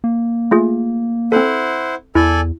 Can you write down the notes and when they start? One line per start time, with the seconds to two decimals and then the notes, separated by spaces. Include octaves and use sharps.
0.04 A#3
0.51 A3 F4 G#4
1.32 C4 E4 A4 C5 F#5
2.15 E2 E4 A4 D5 G#5